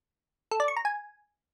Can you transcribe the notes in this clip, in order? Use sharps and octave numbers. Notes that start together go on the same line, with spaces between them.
A4
D5
C#6
A#5
G#5